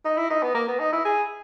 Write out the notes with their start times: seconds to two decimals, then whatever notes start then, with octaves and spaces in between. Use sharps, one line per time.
0.05 D#4
0.17 E4
0.30 D#4
0.42 B3
0.54 A#3
0.68 B3
0.80 D#4
0.92 E4
1.05 G#4